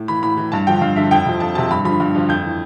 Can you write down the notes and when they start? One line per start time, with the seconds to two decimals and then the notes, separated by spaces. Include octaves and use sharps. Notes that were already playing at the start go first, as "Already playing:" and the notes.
Already playing: A2
0.08 E3 B5
0.22 A2 B5
0.37 E3
0.52 G2 A5
0.67 D3 F3 G5
0.81 G2 F5
0.96 D3 F3 E5
1.11 F2 G5
1.26 C3 F3
1.40 F2 A5
1.55 C3 F3 A5
1.70 G2 B5
1.85 D3 F3 B5
2.00 G2
2.15 D3 F3
2.29 F2 G6
2.44 E3